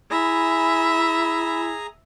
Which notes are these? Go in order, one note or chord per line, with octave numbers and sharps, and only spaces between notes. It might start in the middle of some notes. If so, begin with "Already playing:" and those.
E4 G#4 E5 G#5 A#5 B5